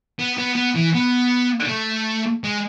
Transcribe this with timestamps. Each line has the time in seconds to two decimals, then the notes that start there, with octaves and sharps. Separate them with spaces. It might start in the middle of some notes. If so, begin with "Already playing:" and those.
0.19 B3
0.38 B3
0.55 B3
0.75 E3
0.94 B3
1.69 A3
2.44 G#3